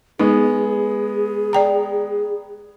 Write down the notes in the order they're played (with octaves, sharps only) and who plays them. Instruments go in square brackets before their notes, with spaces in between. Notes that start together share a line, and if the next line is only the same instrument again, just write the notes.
[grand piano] G#3 B3 [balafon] D#4 [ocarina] G#4
[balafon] D5 G5 A#5